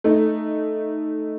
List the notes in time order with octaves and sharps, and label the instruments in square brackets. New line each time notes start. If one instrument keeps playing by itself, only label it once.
[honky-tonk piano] A3 D#4